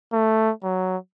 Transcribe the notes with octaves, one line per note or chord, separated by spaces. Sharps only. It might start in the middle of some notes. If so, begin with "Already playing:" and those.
A3
F#3